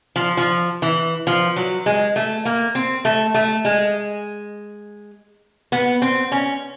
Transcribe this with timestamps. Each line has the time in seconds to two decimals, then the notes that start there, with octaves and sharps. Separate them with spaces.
0.16 F3
0.37 F3
0.82 E3
1.27 F3
1.56 F#3
1.86 G#3
2.16 A3
2.45 A#3
2.75 C4
3.05 A3
3.34 A3
3.65 G#3
5.72 B3
6.02 C4
6.32 C#4